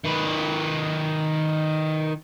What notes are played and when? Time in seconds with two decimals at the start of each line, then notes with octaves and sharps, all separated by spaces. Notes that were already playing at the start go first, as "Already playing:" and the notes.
0.05 D#3 B4